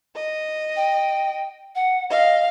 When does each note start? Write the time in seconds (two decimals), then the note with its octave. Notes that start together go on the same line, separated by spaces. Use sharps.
0.15 D#5
0.76 G5
1.75 F#5
2.10 D#5 F5